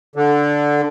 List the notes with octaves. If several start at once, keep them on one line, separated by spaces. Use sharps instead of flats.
D3